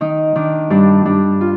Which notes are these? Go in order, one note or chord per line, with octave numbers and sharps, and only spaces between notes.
D#3 D#4
D#3 D4
G2 D4
G2 D4
F4